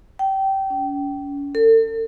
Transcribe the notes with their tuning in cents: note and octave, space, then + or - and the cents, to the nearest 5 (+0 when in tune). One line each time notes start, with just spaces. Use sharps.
G5 -20
C#4 +40
A4 +40